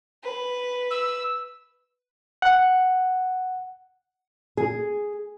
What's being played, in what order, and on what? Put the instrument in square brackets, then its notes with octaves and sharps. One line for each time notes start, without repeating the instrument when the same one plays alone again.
[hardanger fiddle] B4
[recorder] E6
[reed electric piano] F#5
[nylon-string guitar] G#4